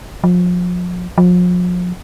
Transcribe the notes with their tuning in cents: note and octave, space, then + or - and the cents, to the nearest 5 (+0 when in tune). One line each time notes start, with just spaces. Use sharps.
F3 +35
F3 +40